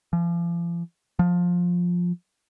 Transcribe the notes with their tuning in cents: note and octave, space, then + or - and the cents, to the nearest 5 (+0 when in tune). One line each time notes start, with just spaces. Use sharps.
F3 -40
F3 +15